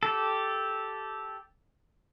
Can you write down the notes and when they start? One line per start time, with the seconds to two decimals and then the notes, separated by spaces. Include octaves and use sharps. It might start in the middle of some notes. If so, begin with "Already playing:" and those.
0.03 G4 A4